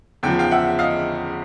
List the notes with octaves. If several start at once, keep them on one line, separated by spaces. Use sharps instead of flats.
E2 C#3 F3 G5
F5 G5
E5 F#5
D#5 F5